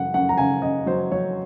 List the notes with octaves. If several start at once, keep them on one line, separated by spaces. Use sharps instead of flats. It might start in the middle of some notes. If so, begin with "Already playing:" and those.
Already playing: F#2 C#3 F#5
F#2 F#5
A#5
C#3 G#5
C#3 D#5
F#3 C5
F#3 C#5